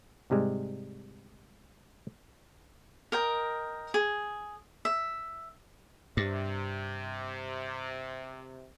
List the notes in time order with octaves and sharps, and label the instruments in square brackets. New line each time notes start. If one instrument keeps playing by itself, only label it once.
[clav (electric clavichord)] G#2 C3 G3 G#3
[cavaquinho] A#4 D#5 G5
G#4
E5
[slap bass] G2 [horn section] C3